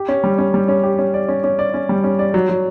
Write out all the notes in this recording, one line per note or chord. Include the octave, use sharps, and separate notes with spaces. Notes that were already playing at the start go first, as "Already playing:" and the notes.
Already playing: G4
C#4
G3
C#4
G3
C#4
G4
C#4
D5
C#4
C#4
D5
C#4
G3
C#4
D5
F#3
F#3